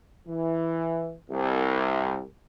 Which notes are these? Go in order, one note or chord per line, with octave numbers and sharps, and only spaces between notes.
E3
C2